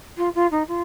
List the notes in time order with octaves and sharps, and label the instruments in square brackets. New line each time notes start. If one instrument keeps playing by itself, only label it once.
[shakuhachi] F4
F4
D#4
F4